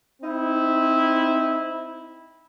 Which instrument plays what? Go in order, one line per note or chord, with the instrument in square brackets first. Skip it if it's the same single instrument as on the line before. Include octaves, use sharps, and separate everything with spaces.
[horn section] C4 D#4 E4